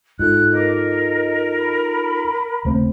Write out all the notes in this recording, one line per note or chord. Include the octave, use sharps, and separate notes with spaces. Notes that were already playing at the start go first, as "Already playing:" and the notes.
G#2 D#4 F4 A4 F#6
A#4 D#5 D6
D#5
A#5 B5
D#1 C#3 A3 C4 C5